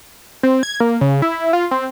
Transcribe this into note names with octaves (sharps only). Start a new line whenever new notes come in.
C4
G#6
A#3
C#3
E4
F4
C4